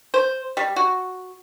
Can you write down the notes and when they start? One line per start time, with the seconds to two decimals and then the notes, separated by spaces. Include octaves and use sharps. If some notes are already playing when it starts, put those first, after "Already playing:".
0.14 C5
0.57 G3
0.76 F#4